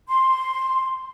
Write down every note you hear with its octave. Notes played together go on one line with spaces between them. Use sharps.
C6